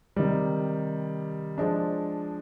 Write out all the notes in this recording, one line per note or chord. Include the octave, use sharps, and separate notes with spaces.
C3 D#3 G3
F3 G#3 D4